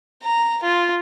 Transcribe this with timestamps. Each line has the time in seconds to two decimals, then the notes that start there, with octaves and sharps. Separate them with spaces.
0.23 A#5
0.63 F4